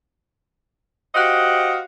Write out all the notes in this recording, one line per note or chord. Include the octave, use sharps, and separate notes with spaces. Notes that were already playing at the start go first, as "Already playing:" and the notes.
F#4 G4 C5 D#5 F5 F#5